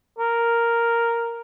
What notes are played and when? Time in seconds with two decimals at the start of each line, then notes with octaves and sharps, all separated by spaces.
0.19 A#4